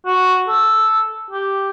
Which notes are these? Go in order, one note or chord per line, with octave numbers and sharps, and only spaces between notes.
F#4
A4
G4